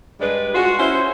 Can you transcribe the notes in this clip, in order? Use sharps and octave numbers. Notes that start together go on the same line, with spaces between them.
G2 G3 G#3 B4 D5
G#3 F4 F#4
C#4 E4 C5